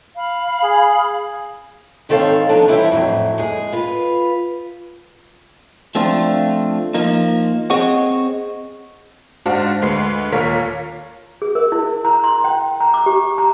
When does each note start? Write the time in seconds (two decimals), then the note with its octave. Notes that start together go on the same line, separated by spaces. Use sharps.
0.16 F5 B5
0.63 G#4
2.09 G#2 D#3 C4 A4 C#5 F5
2.49 F3 B3 D4 D#4 C#5
2.68 E3 G3 E4 C5 C#5
2.92 F2 A2 F#3
3.38 G#3 G#4
3.73 F4 B4
5.95 F3 A3 C4 D4 F4
6.94 F3 A#3 D#4
7.70 C4 G#4 C5 C#5 D#5 F#5
9.46 G#2 D4 F#4 C5 F5 A5
9.82 D2 G#3 B4 C6 C7
10.32 D#2 A#2 A#4 C#5 F5 B6
11.42 G#4
11.55 A#4
11.72 E4
12.05 A#5
12.24 C6
12.44 G5
12.81 A#5
12.94 D6
13.06 G4
13.38 A#5